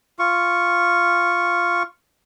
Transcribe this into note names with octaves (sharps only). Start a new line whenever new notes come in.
F4 C#6